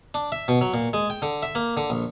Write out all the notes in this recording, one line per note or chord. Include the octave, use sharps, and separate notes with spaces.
D4
E5
B2
F#3
A#2
G#3
G5
D3
E5
A#3
D3
A#1